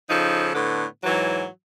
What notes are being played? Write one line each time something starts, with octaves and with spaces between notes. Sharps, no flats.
C#3 F3 D#4 A4
A2 D3 B3
G#2 E3 F#3